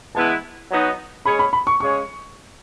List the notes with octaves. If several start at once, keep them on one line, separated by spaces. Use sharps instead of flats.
E3 G#3 B3 E4 A5
F#3 B3 D#4 F#4
G#3 C#4 G#4 C#5 B5
B5
B5
C#6
C#3 G#3 C#4 G#4 C#5 C#6